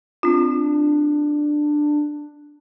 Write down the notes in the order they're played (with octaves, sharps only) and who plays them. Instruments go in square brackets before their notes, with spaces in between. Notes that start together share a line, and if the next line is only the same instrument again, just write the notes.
[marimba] C4 F4 [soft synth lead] D4